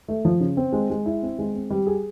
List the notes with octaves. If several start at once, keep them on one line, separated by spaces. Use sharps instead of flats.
A3
F3
C#3
C4
G#3
G#3
E4
C4
G#3
C4
G3
G#4